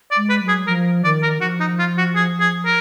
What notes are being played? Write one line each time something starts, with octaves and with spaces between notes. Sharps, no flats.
D5
G#3
B4
F#3
G#4
F3 A#4
D#3 D5
A#4
F3 F#4
D#4
F4
F#4
G#4
G#4
A#4